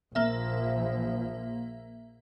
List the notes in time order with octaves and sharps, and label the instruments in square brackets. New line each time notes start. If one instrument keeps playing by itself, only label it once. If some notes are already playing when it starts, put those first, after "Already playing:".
[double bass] A#1 F3 [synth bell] A#3 E5